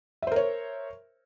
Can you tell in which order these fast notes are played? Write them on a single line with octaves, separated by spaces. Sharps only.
E5 C5 A#4 C#5